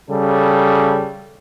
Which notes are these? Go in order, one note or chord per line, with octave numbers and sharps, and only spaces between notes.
C#3 G3 A4